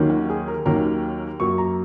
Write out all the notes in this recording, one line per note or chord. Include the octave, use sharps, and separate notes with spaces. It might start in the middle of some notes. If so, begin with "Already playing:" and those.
Already playing: D#2 D#3 F#3 A#3 C#4
F#4
G#4
A#4
D#2 D#3 F#3 A#3 C#4 A#4
F#2 F#3 A#3 C#6
A#5